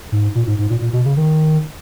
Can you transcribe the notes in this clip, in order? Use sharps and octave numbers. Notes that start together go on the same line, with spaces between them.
G#2
A#2
G#2
G#2
A#2
A#2
B2
C#3
D#3